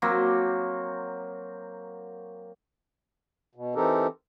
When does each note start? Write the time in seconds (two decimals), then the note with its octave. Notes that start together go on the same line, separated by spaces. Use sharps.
0.02 F#3 A#3 C4
3.55 B2
3.75 E3 C4 D#4 G4 A4 A#4